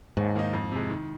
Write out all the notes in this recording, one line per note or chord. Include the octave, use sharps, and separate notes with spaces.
D#2 G#2
D#3 A#3 D#4
F2
C3 G#3
D#3